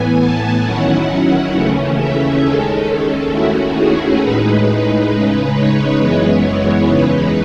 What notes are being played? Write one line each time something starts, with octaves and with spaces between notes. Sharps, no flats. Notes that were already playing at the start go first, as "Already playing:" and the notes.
Already playing: A2 E3 B3 G#5
A5
D#3 F#3 C#4 E4 F#5
F#5
D#2 C#3 E3 A3 C#4
E5
D#2 D#3 G#3 C#4 A4
D#2 D#3 A3 C#4 E4 F#4
G#4
A2 G#3 D#4 B4
C#3 G#3 D#4 B4
C#5
F#2 E3 G#3 B3 E4 C#5
E2 C#3 E3 G#3 D#4 B4